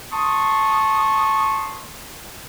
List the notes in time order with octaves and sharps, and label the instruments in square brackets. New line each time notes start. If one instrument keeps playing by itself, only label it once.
[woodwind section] A5 C6 C#6 D#6